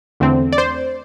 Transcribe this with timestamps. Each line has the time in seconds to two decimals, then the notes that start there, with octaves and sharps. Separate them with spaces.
0.20 E2 D3 A3 C4
0.52 D5
0.58 C5